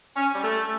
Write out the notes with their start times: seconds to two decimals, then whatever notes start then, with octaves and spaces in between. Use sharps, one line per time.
0.16 C#4
0.34 G3
0.43 A3